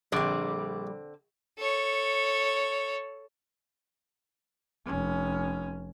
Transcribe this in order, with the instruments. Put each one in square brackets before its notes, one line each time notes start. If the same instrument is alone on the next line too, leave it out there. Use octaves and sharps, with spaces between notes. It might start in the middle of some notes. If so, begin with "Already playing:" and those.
[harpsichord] A#1 [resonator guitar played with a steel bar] D3 C4 [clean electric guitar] G3 D5
[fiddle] A4 C#5
[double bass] F1 C#4